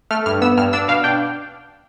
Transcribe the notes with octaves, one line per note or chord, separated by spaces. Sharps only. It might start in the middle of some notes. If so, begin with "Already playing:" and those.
A3 F6
G2 F6
B3 E6
G2 F6
D4 E6
B2 F5
D4 G5